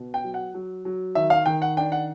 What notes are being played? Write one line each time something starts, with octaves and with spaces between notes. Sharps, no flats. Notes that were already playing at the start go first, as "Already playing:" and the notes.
Already playing: B2
G5
F#3
F#5
F#3
F#3
D#3 E5
F5
D#3 G5
F#5
D4 G5
F#5